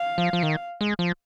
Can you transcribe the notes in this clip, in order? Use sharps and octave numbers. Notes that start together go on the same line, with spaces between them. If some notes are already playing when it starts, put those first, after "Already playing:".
Already playing: F5
F3
F3
D#3
G#3
F3